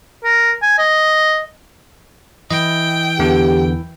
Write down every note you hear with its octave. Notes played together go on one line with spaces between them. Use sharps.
A#4
G#5
D#5
E3 D#5 G5
E2 D3 B3 G4